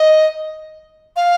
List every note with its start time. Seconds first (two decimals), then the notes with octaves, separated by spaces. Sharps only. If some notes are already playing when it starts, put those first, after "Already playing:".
Already playing: D#5
1.16 F5